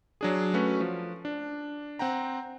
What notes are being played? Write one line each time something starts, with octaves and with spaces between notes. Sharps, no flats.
F#3 D4 G#4
A3 C#4 F#4 B4
F3
D4
C4 F#5 G5 A#5